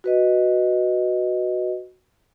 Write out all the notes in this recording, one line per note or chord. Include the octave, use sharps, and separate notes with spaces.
F#4 B4 D#5